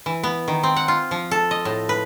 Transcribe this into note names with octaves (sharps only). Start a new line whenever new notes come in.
E3
B3
D#3
C4
F#5
F4
F3
A4
D#5
A2
B4